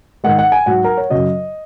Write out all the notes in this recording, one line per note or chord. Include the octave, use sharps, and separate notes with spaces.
G#2 D#3 G#3 F#5
F#5
G#5
G#2 F#3 F#5
A#4
C#5
F#2 C#3 F#3 D#5